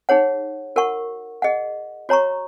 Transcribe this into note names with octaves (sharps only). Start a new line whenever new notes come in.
D#4 G#4 C#5 F#5
F#4 A#4 F#5 C#6
G#4 D#5 F#5
F#4 C#5 A#5 C#6